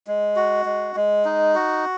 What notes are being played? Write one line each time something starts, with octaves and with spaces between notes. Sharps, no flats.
G#3
F#4
G#3
G#3
D#4
F#4